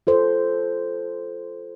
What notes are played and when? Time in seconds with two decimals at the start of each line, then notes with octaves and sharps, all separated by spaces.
0.07 F4 A4 C5